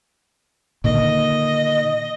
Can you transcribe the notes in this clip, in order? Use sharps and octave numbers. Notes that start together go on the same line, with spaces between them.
A#2 D3 D#3 D#5